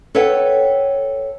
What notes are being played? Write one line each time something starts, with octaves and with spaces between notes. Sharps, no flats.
A4 B4 C#5 E5 F#5 G5